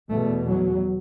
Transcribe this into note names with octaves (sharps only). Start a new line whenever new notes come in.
E2 B2 A3
F#3